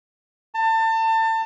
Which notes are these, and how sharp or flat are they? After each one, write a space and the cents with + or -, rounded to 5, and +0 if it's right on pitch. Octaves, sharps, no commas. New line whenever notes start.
A5 +30